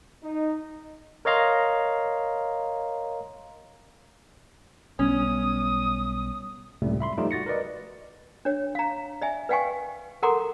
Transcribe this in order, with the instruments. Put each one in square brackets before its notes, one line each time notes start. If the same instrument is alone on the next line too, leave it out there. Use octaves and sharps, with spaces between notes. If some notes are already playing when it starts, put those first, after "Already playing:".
[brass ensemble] D#4
[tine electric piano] A#4 C#5 D#5 F5 A#5 C6
[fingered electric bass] B1 G3 B3 [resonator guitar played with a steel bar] C#4 [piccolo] D#6
[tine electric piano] C#2 F#2 A2 C3 G3 A3
E5 B5 C6
F3 G3 A3 D#4 F4 G4
F#4 A6 A#6 C#7
A#4 B4 D5 D#5
[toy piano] D4 C#5
F5 A#5
D5 E5 G#5
B4 D5 F5 G5 G#5 C#6
A4 A#4 F#5 A#5 C6 D6